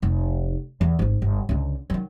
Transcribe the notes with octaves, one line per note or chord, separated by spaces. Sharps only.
F1 D#4
E2
G#1 G#2
G1
C#2 D3
D#3 F#3